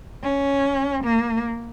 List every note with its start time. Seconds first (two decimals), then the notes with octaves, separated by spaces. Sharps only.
0.23 C#4
1.04 A#3